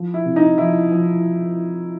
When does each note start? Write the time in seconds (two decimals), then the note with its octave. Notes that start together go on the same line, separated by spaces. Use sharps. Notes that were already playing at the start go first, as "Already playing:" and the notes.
Already playing: F3
0.14 E4
0.26 C3
0.36 D#4
0.58 F3 E4
0.91 F3